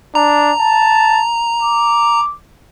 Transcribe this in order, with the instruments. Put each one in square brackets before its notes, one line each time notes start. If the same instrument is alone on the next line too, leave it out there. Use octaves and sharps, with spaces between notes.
[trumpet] D4 [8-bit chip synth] A#5
[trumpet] A5
D6